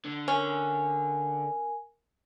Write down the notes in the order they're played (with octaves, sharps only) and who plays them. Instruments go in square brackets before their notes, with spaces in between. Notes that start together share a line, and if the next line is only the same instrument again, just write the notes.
[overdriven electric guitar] D3
[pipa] C#4 [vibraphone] A#4 G#5